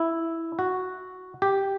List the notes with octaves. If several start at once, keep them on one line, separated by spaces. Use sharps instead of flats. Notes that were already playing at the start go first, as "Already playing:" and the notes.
Already playing: E4
F#4
G4